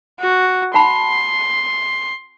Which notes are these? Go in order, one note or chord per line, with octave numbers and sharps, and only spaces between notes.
F#4
F#5 A5 B5 C6